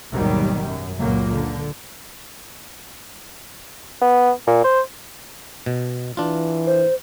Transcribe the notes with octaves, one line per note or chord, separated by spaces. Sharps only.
G#1 D#2 B2 D#3 F#3 G3
F#2
C#2 F#2 A#2 F#3 A#3
D3
B3
A#2
C5
B2
E3 D4 F4
C5